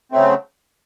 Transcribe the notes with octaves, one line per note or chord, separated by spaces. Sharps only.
C#3 F#3 A3 C4